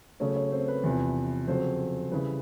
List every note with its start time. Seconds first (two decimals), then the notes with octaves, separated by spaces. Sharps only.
0.20 C#3 F#3 A3 C#4 C#5
0.36 C#4 C#5
0.52 C4 C5
0.68 B4
0.83 E2 C3 F3
1.47 F2 C#3 F#3 C4 C5
2.11 C#3 E3 G3 B4